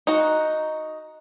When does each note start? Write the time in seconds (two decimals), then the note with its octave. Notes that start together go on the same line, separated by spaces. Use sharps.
0.07 D#4 F#4